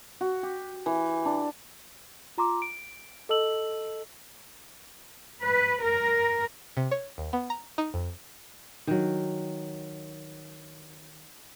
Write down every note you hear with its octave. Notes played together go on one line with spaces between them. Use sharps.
F#4
G4
E3
D4
F4 A#5 C6 D6
D7
A4 D#5 A5 E6 F#7
B4
A#4
C3
C#5
D#2
B3
A#5
D#4
F2
D#3 F#3